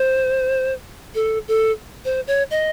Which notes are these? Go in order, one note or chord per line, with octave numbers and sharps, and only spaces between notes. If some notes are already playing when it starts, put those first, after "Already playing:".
Already playing: C5
A4
A4
C5
C#5
D#5